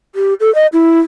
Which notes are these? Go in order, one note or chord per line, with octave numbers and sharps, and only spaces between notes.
G4
A4
D#5
E4